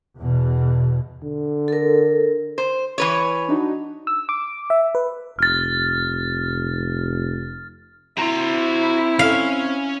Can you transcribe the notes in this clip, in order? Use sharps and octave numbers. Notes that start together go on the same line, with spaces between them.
E2 B2
D3
A4 A#4
C5
E3 B4 C#5
D4 D#4 F#4
E6
D6
E5
B4
F1 F6 A6
C4 E4 F#4 A#5 C6
C#4 F5